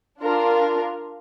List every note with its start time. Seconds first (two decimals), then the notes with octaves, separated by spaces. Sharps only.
0.22 D4 F4 A#4